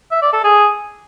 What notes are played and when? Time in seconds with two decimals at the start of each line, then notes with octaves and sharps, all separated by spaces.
0.11 E5
0.22 D5
0.33 A4
0.44 G#4